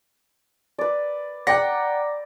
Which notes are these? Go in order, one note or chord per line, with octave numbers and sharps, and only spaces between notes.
B4 D5
D5 F#5 G5 A#5 A#6